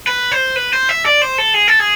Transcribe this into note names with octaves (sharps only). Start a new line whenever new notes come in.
B4
C5
B4
C5
E5
D5
C5
A4
G#4
A4
G#4